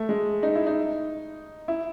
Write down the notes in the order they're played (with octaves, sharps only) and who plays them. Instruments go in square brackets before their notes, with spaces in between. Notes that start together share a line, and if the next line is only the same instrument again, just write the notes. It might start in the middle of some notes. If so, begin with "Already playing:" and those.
Already playing: [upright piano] A3
G#3
D#4
E4
D#4
E4